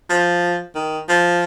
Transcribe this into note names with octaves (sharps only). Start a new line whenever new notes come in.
F3
D#3
F3